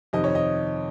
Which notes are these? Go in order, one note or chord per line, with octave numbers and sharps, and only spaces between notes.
F2 C3 D#3 D#5
C#5
D#5